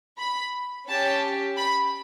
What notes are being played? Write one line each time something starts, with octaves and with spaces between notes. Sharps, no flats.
B5
C#4 G4 A5
B5